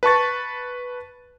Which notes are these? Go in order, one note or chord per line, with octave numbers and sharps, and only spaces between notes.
B4 A5 C#6 A6